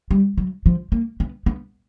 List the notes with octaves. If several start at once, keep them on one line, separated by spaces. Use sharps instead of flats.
G3
F#3
F3
A#3
B3
B3